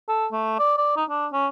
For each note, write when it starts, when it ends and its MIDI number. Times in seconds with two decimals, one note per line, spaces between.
0.09 0.27 69
0.32 0.58 57
0.59 0.74 74
0.78 0.94 74
0.97 1.04 63
1.10 1.27 62
1.32 1.48 61